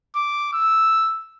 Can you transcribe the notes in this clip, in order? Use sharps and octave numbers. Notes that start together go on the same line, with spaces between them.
D6
E6